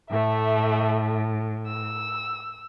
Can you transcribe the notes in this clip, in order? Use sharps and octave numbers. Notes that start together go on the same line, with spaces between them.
A2 A3 E5
E6